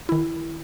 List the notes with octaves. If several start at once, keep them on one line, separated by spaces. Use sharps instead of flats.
D#3 E4